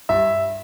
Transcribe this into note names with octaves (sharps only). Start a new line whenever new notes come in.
G2 E5